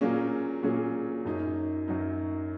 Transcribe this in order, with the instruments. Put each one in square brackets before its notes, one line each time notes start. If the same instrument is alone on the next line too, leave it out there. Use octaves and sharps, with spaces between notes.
[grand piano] A#2 F#3 A#3 C#4 G#4
A#2 F#3 A#3 C#4 G#4
F#2 F#3 D#4
F#2 F#3 D#4